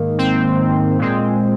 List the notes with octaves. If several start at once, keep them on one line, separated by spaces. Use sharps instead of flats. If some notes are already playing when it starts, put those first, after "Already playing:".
Already playing: G#2 D#3 A#3
C4
A#2 G#3 C4